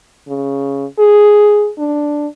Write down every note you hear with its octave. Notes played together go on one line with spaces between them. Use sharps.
C#3
G#4
D4